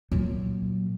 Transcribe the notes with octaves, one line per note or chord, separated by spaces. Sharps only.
A#2 F#3